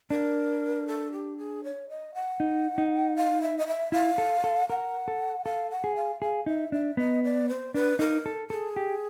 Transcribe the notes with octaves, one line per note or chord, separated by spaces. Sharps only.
D4 A#4
A4
G4
G#4
C#5
D#5
F#5
D#4
D#4
F5
E5
D#5
E5
E4 F5
A4
A4
A#4 F#5
A4
A4 F5
F#5
G#4
F5
G#4 F5
D#4 E5
D4 E5
B3 D#5
D5
C5
D4 B4
D#4 A#4
A4
G#4 A4
G4